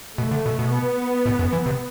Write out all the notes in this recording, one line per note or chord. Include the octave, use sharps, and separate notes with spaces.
B2 A3
D3
B2
B2
B3
A2
F#2
E3
C3